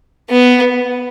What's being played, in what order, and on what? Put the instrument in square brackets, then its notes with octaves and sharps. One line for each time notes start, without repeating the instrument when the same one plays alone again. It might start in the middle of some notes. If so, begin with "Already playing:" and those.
[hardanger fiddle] B3